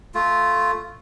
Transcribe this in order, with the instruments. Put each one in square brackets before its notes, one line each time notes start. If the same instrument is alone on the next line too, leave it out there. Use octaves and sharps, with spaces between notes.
[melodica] A3 F4